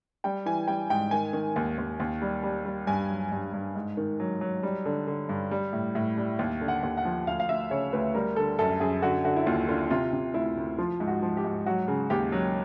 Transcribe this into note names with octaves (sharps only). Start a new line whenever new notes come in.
G3 G5
E3 G#5
G3 G5
G#2 G5
D#3 G#5
D#3
D#2
D#2
D#2
G3
G3
G3
G2 G#5
F#3
G2
G2
G#2
D#3
F#3
F#3
G3
D3
D3
G2
G3
A2
A2
G3
D#2
D3
F#5
D#2
F#5
F3
D2 F5
F5
D2 E5
C#3 C#5
D2 B4
G3 A#4
D3 A4
F#2 A4
F#2 G#4
D3 F#4
D3 F#4
E4
D#2 F4
D3 F4
C3 F4
C3
D2 E4
D2
F3 F4
G#2
F#4
F3
G4
G#2
F#3 F#4
C#3
D#2 G4
F#3